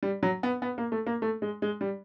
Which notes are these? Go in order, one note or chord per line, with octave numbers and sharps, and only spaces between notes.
G3
F#3
B3
B3
A#3
A3
A#3
A3
G#3
G#3
G3